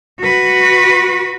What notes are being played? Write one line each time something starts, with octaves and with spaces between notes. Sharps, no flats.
F#4 B4